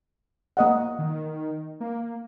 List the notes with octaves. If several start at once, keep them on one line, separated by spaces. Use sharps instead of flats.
A#3 D#5 F#5
D#3
A#3